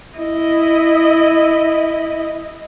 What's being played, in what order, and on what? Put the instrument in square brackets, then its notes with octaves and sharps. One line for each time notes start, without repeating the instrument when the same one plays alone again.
[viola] E4 D#5